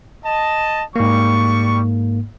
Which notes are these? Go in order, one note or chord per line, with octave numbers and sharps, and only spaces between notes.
D#5 A5
G#2 G3 A#3 C#6